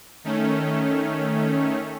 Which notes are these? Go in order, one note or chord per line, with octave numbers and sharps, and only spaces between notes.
D#3 A3 C#4